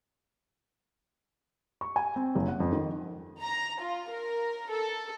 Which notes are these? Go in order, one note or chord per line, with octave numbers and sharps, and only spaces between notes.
C#6
G#5
C4
F#1
F#5
F2
D#3
A#5
F4
A#4
A4